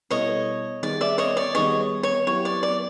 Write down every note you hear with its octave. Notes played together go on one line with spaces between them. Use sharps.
B2 G3 B3 E4 A4 C#5 D#5
D#3 G3 B3 D#4 G#4 D5
D5 E5
C#5 D#5
D5
D#3 G3 B3 D#4 G#4 C#5 D#5
C#5
F#3 B3 E4 G4 C#5
D5
D5